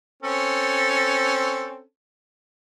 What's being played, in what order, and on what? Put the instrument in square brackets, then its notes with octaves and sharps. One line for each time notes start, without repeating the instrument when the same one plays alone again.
[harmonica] C4 C#4 A4